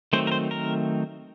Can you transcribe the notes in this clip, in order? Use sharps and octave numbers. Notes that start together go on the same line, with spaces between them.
D#3 F#3 A3 C4 C5
A#4
C5
A#4